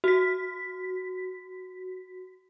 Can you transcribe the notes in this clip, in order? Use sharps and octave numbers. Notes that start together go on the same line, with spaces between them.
F#4 B6